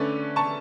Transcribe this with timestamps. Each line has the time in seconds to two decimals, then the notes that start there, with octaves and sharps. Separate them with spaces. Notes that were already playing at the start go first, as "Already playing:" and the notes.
Already playing: D3 A3 C#4 B4 D5
0.36 A5 C#6